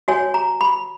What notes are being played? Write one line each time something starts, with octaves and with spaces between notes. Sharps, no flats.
F#4 C#5 G#5
A#5
B5